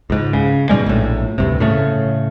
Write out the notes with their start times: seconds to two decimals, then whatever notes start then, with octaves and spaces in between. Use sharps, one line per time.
0.10 C#2 G#2
0.33 C#3
0.69 G#2 B2 G3 G#3
0.86 A#1 A2
1.38 D2 G2 C3
1.60 A2 C#3 A3